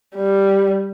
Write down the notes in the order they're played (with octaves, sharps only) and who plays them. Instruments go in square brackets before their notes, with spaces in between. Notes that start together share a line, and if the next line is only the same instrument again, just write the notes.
[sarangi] G3